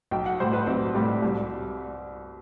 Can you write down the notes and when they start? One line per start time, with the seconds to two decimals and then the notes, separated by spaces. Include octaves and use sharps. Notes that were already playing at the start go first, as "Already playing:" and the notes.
0.11 B1 G5
0.26 F#5
0.40 A2 G3 C5
0.53 B4
0.67 B1 C4
0.95 A2 G3
1.22 C2